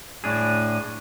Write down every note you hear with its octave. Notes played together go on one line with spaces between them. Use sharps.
A2 D4 G#4